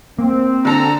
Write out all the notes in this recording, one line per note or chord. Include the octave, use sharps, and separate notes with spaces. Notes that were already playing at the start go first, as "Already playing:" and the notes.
A#3 C4
D3 A4 A#5